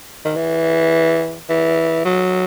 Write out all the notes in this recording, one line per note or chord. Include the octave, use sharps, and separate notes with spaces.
D#3
E3
E3
F#3